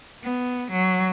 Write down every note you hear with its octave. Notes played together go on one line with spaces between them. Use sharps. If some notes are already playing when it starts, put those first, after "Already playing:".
B3
F#3